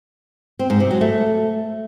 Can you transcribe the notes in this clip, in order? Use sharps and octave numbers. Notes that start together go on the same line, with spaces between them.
C4
G#2
C3
F#3
A3